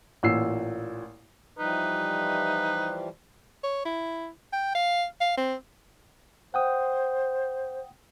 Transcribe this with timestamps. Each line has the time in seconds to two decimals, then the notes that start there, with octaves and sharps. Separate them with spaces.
0.23 A1 A#2 E6 C7
1.59 E3 F3 G3 D#4 B4
3.63 C#5
3.85 E4
4.53 G5
4.75 F5
5.21 F5
5.37 C4
6.54 C5 F#5 G5 D#6